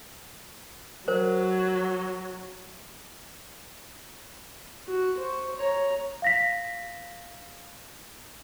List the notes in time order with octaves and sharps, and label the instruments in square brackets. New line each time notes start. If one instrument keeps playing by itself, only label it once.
[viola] F#3 [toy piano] A#4 C5
[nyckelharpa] F#4
C5 C#6
C#5 A#5
[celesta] F5 A#6 B6